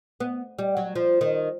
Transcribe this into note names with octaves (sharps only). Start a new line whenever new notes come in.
B3
G3
F#3
F3
D#3